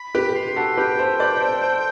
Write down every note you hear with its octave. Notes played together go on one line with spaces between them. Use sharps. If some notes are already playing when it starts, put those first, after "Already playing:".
Already playing: B5
G4 B4
C6
F#4 A4
G4 B4 G5
A4 C5
B4 D5
A4 C5
A4 C5